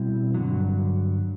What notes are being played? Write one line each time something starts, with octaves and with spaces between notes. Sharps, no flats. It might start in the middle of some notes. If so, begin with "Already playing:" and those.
Already playing: B2 G3 C4 E4
G2 D3 F#3